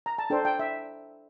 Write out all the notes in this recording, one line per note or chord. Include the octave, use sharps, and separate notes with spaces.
A#5
A5
D4 A4 C5 G5
G5
E5